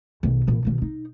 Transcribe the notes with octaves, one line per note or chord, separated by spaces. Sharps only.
B1 D#3
A#2 E3
B2 D#3
D#4